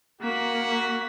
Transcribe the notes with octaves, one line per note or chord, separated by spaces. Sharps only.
A#3 F#4 B6